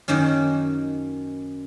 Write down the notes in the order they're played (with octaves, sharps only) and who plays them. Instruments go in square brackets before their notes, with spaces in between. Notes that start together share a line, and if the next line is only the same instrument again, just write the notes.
[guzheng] F#2 D#3 A#3 C#4